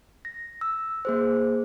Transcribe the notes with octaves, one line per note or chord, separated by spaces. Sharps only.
A#6
E6
A#3 G#4 C5